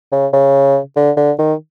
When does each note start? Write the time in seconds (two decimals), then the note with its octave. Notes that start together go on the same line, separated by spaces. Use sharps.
0.12 C#3
0.33 C#3
0.96 D3
1.17 D3
1.39 D#3